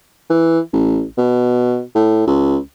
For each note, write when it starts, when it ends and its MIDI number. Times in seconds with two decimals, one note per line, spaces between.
0.30 0.60 52
0.73 1.04 33
1.17 1.82 47
1.95 2.22 45
2.27 2.57 37